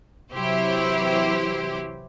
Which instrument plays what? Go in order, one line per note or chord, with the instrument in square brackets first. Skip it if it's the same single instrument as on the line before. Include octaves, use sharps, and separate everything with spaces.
[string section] C3 E3 F#3 E4 G4 C5